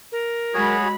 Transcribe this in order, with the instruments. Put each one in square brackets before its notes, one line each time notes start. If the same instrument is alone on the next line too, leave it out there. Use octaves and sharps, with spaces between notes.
[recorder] A#4
[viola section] F#3 G#3 B5 [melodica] F#4 G#4 C#5